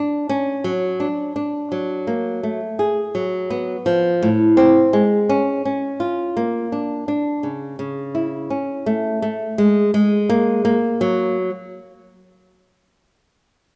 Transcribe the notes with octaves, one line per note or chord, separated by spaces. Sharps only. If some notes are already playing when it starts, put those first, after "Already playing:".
Already playing: D4
C#4
F#3
D4
D4
F#3
A#3
A3
G#4
F#3
B3
F3
A2
C4
G#3
C#4
C#4
F4
A#3
D4
D4
C#3
C#3
E4
C#4
A3
A3
G#3
G#3
A#3
A#3
F#3